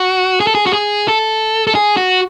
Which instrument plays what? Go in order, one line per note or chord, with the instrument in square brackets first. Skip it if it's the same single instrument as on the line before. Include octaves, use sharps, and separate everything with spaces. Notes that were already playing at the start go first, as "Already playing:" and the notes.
Already playing: [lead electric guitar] F#4
G#4
A4
G#4
F#4
G#4
A4
A4
G#4
F#4